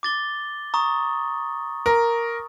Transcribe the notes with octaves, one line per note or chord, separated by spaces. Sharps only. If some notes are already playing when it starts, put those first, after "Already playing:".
D6 A6 G7
A#5 C#6 D#6
A#4